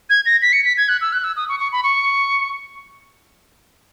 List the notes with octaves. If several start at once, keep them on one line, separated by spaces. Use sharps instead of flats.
G#6
A#6
B6
C#7
B6
G#6
F#6
E6
F#6
E6
D#6
C#6
C#6
B5
C#6